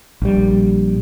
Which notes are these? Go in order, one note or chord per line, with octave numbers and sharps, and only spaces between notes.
A#1 G3